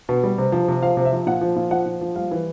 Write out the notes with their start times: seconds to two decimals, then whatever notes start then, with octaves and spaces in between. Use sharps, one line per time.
0.09 B2
0.23 G3
0.38 C3
0.52 F3
0.68 C3
0.82 F3 F5
0.97 C3
1.05 E5
1.12 F3
1.27 A#2 F#5
1.41 F3
1.56 A#2
1.71 F3 F#5
1.86 A#2
2.01 F3
2.16 G3 F5
2.31 E3